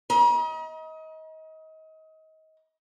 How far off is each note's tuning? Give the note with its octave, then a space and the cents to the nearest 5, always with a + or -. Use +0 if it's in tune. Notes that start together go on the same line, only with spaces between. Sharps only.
D#5 +30 A#5 +45